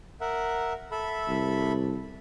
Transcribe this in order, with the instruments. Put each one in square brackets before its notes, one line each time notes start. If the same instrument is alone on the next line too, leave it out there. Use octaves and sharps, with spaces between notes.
[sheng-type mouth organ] A#4 E5 F#5
A4 E5 B5
[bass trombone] C2